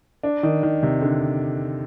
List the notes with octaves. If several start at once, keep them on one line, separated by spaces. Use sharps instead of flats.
D4
D#3
D#3
C3
D3